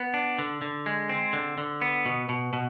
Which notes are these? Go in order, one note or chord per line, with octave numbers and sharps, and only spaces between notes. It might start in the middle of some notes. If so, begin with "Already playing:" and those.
Already playing: B3
D4
D3
D3
G#3
C4
D3
D3
B3
B2
B2
B2